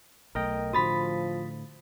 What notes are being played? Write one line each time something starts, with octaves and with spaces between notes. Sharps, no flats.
B1 A3 A#4 D#5 G5
A2 D3 F3 F#4 B5 D#6 A6 B6